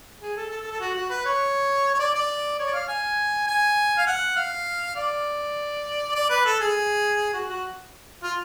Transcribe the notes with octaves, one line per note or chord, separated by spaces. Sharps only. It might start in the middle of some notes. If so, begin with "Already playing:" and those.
G#4
A4
A4
A4
A4
F#4
F#4
B4
C#5
C#5
D5
D5
C#5
D5
F5
G#5
G#5
F5
F#5
F5
D5
D5
B4
A4
G#4
F#4
F#4
F4